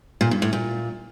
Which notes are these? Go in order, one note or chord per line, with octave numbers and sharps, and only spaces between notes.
A#2
G2
A2
A#2